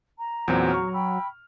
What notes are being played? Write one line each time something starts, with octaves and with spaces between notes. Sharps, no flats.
A#5
E2 A#2 F#3 C4
C#6 F6
G5 B5 E6